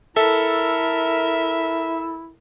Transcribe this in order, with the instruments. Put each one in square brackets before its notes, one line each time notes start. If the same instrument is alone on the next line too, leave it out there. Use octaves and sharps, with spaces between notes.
[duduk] E4 [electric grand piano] A4 [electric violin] A#4 [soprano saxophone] E5